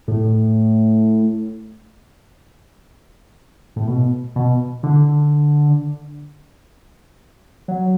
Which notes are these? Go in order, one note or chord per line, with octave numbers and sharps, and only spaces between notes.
A2
A2
B2
B2
D3
F#3